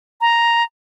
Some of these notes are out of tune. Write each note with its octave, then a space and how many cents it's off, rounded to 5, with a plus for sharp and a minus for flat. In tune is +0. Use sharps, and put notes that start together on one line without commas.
A#5 +0